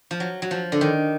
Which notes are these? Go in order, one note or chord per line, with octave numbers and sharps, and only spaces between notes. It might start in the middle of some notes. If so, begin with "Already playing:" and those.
F3
F#3
F#3
F3
D3
D#3